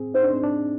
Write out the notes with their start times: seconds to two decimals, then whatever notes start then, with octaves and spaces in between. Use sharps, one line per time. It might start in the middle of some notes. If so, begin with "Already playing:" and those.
Already playing: C4 G#4
0.14 D#4 C5
0.23 D4
0.33 C4
0.44 D4